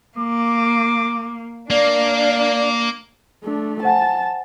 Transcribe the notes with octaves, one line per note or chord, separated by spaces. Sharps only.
A#3 D6
A#3 D4 D5 F5
A3 D4
C5 F#5 G#5 A5